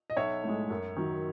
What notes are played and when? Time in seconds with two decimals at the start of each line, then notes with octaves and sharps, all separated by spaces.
0.10 D#5
0.17 B1 C#5 E5
0.44 A2 G#3
0.70 F#2
0.97 D#3 F#3